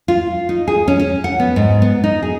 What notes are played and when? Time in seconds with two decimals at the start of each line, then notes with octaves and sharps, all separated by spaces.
0.08 F4
0.49 D#4
0.68 G#4
0.88 C#4
1.00 C#4
1.24 F#5
1.40 B3
1.56 G#2
1.82 B3
2.04 D#4
2.23 G#4